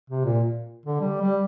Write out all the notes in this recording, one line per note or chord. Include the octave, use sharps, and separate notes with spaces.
C3
A#2
D3
G3
G3